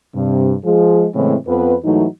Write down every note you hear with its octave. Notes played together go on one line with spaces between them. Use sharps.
G2 C3
F3 G#3 G#4
A2 C#3 E3 G#3 A3 C4
F2 B3 B4
G#2 E3 F#3 A3 D#4